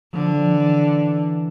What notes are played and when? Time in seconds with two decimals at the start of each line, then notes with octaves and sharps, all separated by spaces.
0.13 D3 F3
0.33 F3
0.53 E3